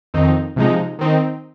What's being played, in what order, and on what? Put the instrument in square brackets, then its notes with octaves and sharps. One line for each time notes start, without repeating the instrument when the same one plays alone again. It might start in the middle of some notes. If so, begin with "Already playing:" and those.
[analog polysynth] F2 D#3 C4 D#4
C3 F3 G#3 D#4
D#3 C4 D#4